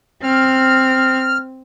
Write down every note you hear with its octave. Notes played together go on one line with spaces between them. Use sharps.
C4 F6